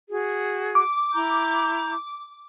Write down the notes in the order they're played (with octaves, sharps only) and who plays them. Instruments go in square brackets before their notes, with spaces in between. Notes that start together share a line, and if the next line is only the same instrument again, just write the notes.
[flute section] F#4 G#4
[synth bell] D6
[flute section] E4 A#5 G6